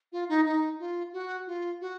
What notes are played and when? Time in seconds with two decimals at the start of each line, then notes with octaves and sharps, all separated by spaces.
0.12 F4
0.29 D#4
0.45 D#4
0.79 F4
1.13 F#4
1.47 F4
1.81 F#4